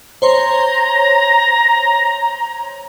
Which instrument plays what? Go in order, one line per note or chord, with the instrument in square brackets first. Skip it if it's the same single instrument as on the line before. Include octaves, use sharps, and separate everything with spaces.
[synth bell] C5 C#5 C6 [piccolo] A#5